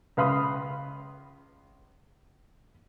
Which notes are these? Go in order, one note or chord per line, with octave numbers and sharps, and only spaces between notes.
C#2 B4 F5 B5 C6 D#6